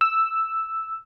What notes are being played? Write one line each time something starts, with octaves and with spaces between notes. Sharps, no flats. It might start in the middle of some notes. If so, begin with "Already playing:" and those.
E6